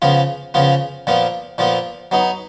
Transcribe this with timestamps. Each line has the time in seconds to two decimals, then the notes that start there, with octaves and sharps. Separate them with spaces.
0.02 C#3 F3 B3 F4
0.54 C#3 F3 B3 F4
1.07 A#2 F3 B3 F4
1.58 A#2 F3 B3 F4
2.11 F#3 B3 D#4